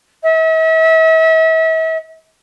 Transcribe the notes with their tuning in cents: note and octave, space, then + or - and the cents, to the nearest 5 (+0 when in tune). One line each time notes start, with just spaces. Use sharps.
E5 -40